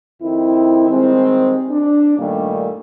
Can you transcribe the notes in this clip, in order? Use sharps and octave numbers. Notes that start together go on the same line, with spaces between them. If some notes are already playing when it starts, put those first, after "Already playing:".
F2 D#3 C4 E4
D#3 G3 G#3 C4
D4
G2 A#2 D#3 G3 A3 A#3